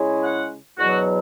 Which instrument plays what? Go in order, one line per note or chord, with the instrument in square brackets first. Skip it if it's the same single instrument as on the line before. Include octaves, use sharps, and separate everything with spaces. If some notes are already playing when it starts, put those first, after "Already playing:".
Already playing: [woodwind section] C#3 G#3 C#4 E4
F#5
E2 B2 F#3 F#4